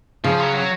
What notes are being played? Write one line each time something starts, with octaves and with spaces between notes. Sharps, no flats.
C#3 F3
F#3
F#3